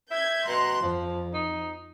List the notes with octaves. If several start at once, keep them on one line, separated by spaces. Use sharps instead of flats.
E5 G6 G#6
B2 A#5 C6 F#6
F2 F3
D#4